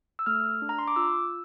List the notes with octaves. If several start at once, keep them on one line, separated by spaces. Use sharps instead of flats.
E6
A3 F6
D4
A#5
C6
D6
F4 E6